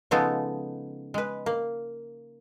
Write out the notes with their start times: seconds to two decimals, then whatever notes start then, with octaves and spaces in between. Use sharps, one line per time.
0.11 C#3 F3 G#3 B3 D#4 A4
1.14 G#3 B4
1.46 A#3